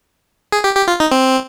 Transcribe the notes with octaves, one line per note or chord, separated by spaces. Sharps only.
G#4
G4
G4
F4
D#4
C4